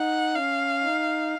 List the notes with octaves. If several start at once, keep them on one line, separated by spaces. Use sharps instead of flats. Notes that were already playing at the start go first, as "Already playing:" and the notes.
Already playing: D#4 F#5
C#4 F5
D#4